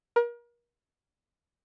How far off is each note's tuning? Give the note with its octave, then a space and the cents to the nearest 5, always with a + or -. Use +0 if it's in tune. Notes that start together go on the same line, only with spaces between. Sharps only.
A#4 +35